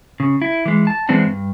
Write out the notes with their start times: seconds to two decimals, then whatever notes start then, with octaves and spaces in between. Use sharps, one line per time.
0.20 C#3
0.42 E4
0.66 E3 G#3
0.87 A5
1.09 E3 G#3 B3 C4 D4
1.26 G2